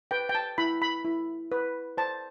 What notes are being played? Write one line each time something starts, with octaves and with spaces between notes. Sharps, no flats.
B4 G5
G5
A5
E4 B5
B5
E4
B4
C5 A5